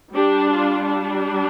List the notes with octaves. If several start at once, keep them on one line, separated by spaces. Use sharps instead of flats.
G3 D4 G4
F4
D4